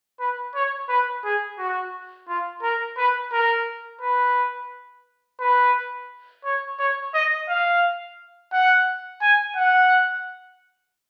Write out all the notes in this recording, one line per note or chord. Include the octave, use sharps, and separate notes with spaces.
B4
C#5
B4
G#4
F#4
F4
A#4
B4
A#4
B4
B4
C#5
C#5
D#5
F5
F#5
G#5
F#5